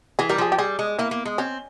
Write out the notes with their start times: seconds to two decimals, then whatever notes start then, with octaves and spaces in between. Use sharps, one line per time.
0.19 E3 G#4
0.29 G3 A#4
0.38 F3 G#4
0.52 G4
0.58 G3 G#4
0.79 G#3
0.99 A#3 E4
1.11 A#3
1.25 G#3
1.38 C4 C#4